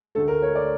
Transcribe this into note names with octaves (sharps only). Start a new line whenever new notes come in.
D2 D3 A3 A4
A#4
C#5
D5